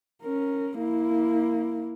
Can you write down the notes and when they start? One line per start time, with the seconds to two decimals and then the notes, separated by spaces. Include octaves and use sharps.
0.23 C#4 A#4
0.79 A#3 E4